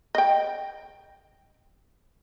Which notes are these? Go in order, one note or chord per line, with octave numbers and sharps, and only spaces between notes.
D#5 G5